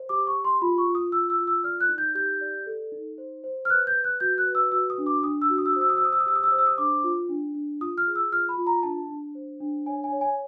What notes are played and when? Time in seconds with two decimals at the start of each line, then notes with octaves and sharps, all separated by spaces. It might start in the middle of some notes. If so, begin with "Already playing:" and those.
Already playing: C5
0.09 G4 D6
0.27 C#6
0.35 G4
0.45 C6
0.62 F4 B5
0.78 C#6
0.87 F4
0.95 D#6
1.12 F4 E6
1.30 E6
1.38 F4
1.47 E6
1.64 D5 F6
1.81 F#6
1.89 D#4
1.98 G6
2.15 G4 G6
2.41 D5
2.66 A4
2.92 D#4
3.18 C5
3.44 C5
3.65 F6
3.70 B4 F#6
3.87 G6
3.95 B4
4.04 F#6
4.20 F#4 G6
4.38 F#6
4.47 B4
4.55 E6
4.72 F#4 E6
4.90 D#6
4.98 D4
5.06 D6
5.23 D4 D#6
5.42 E6
5.50 F#4
5.58 D#6
5.66 E6
5.73 C5 D#6
5.81 E6
5.90 D#6
5.97 E6
6.02 C5 D#6
6.13 E6
6.20 D#6
6.26 G4 E6
6.36 D#6
6.43 E6
6.52 C5 D#6
6.59 E6
6.67 D#6
6.78 D4 D6
7.03 F4
7.29 D4
7.55 D4
7.80 F4 D#6
7.98 F6
8.07 G#4
8.16 E6
8.32 F4 F6
8.49 B5
8.58 F4
8.67 A#5
8.83 D4 A5
9.10 D4
9.35 C5
9.60 D4
9.86 C#5 G#5
10.04 G#5
10.12 C#5
10.21 G#5